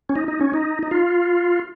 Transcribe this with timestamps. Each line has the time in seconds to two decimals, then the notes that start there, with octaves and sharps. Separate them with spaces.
0.09 C#4
0.16 D#4
0.28 D#4
0.41 C#4
0.54 D#4
0.83 D#4
0.91 F4